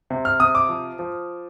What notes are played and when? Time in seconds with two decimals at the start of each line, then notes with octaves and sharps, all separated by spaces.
0.10 C3
0.25 F6
0.40 C3 D#6
0.55 D6
0.69 F3
0.99 F3